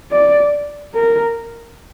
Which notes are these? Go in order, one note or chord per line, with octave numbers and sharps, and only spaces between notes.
D5
A#4